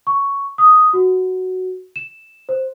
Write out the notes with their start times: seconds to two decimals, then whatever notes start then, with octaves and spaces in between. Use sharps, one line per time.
0.07 C#6
0.58 D#6
0.93 F#4
1.96 E7
2.49 C5